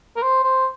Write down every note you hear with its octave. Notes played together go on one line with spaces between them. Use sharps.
A#4
C5
C5